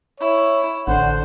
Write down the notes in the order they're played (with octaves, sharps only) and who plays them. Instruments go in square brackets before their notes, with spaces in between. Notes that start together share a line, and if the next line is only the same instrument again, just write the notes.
[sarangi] E4 [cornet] C#5
[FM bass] A1 [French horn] D3 [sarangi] C5 [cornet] F#5